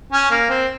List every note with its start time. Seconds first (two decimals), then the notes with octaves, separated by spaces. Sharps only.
0.12 C#4
0.31 A#3
0.49 C4